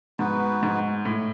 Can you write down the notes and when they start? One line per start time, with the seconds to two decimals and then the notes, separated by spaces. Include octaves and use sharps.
0.19 G#2 B3 D#4 F#4 B4
0.63 G#2
1.05 A2